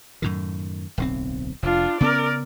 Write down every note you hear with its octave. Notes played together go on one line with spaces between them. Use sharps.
F#2 A2 D#3
D1 B1 C4
F1 D4 F4
C#3 B3 C#4 A#4 D5